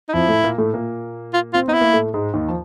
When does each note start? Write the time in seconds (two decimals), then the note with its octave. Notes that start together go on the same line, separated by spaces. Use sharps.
0.09 D#4
0.13 F2 F3 E4
0.28 A2 A3
0.43 A#2 A#3
0.58 A2 A3
0.73 A#2 A#3
1.34 F4
1.54 C4 F4
1.68 B3 D#4
1.74 E4
1.81 A#3
1.93 A2 A3
2.14 G#2 G#3
2.34 D#2 D#3
2.48 F3